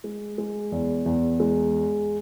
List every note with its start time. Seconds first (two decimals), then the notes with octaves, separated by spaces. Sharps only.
0.04 G#3
0.38 G#3
0.72 E2
1.06 E2
1.40 G#3